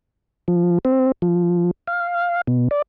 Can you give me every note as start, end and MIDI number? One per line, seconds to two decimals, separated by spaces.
0.48 0.78 53
0.85 1.12 60
1.22 1.71 53
1.87 2.41 77
2.47 2.68 47
2.71 2.82 74